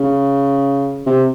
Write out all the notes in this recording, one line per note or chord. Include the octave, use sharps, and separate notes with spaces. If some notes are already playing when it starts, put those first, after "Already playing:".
Already playing: C#3
C3